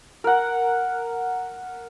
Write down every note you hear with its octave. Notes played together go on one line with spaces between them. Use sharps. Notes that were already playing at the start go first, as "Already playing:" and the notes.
A#4 F#5